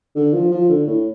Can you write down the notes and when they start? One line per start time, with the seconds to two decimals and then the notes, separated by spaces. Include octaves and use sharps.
0.16 D3
0.34 F3
0.51 F3
0.69 D3
0.87 A2